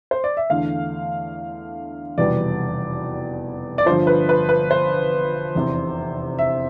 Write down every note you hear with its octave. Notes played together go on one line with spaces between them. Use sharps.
C5
D5
E5
E2 D3 A3 F5
F1 E2 B2 G3 B3 D5
D5
G1 G2 F3 C5
B4
B4
B4
C5
F1 E2 C3
E5